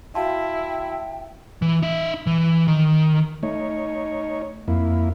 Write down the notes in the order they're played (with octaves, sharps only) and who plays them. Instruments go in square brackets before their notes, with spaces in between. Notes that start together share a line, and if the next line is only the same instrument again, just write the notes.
[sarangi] E4 [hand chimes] F#4 F5 C6 [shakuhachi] G5 [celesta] A5
[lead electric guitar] E3
D#4 E5
E3
D#3
[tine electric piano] A3 [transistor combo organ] D#4 C#5
[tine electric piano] F2 [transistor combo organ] A#3 E4